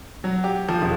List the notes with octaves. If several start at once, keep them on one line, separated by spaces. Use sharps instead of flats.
F#3
G4
F3
E1